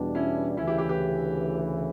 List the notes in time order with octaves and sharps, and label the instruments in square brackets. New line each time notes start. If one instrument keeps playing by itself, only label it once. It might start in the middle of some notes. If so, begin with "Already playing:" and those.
Already playing: [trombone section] E2 B2 G3 D4
[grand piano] C#4 E4
[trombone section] D2 C#3 E3 [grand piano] C#4 E4
[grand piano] E4 G4
E4 G4
G4 B4